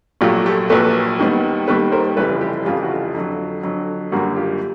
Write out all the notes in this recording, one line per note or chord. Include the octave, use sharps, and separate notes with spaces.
A#1 A#2 F#3 A3 F4 G4
G4 A4
A#1 A#2 F#3 A3 A4 B4
D#2 D#3 G3 B3
D#2 D#3 G3 B3 A4 B4
A#4 C5
F1 F2 C#3 E3 G3 A4 B4
G4 A4
F1 F2 C#3 E3 G3 F4 G4
F#4
F4
F2 D3 F#3
F2 D3 F#3
F#1 F#2 D3 G3 A#3 F#4
F4 G4